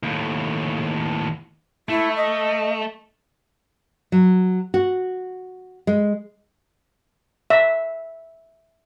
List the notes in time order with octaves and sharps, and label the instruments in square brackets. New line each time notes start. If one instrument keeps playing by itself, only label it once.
[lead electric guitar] D#2 A2
[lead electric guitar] A3 [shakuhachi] E4
[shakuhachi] D#5
[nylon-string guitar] F#3
F#4
G#3
[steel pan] E5